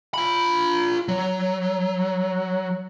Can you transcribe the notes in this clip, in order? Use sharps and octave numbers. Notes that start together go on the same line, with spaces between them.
F4 B5
F#3